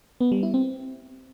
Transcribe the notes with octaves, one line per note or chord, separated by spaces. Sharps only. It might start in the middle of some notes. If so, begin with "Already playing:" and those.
B3
G3
E4
C4